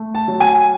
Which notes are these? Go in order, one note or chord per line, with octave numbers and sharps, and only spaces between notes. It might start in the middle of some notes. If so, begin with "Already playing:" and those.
Already playing: A3
A5
F#3
G#5